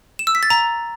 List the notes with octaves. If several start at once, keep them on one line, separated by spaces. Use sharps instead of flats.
E7
E6
B6
A6
A#5